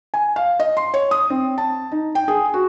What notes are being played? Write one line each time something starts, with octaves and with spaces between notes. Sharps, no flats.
G#5
F5
D#5
C6
C#5
D#6
C4
A5
D#4
G5
G#4
F#4